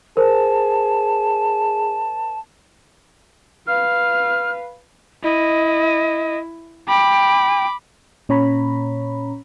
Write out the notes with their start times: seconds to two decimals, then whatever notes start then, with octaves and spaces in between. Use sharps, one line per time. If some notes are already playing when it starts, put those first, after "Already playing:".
0.17 G#4 A#4 C5 A5
3.67 B4 F5 F6
5.24 E4 D#5
6.88 G5 B5 D6
8.29 A#2 C#4 C#5 A#5 B5